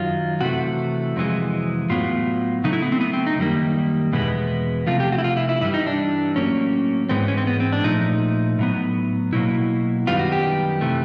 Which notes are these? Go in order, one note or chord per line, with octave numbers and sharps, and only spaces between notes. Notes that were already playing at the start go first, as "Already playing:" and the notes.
Already playing: F#2 D#3 F#3 F4
C3 E3 A3 F#4
F2 C3 E3 G#3
A2 F#3 B3 F4
C#3 F#3 A3 D#4
E4
B3
C4
B3
C4
D#4
F#2 D#3 G3 A#3
E2 B2 G#3 B3
C3 F3 A3 F4
G4
F#4
E4
F4
E4
E4
G2 E3 G3 E4
D#4
D4
A2 F#3 A#3 C#4
G#2 E3 G#3 B3 C4
C#4
C4
B3
C4
D4
A#2 F3 A3 D#4
A2 F#3 B3
B2 F#3 A#3 E4
F#2 D#3 G3 B3 F4
F#4
G4
C3 E3 A3